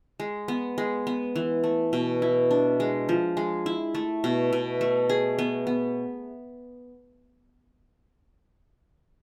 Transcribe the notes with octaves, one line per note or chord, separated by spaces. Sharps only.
G#3
B3
G#3
B3
E3
A3
B2
E4
D4
G#3
F3
G#3
E4
A3
B2
B2
A3
G#4
B3
B3